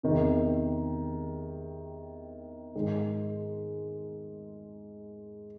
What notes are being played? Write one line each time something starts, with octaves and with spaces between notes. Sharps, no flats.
E2 C3 D#3
G#2 D#3 G#3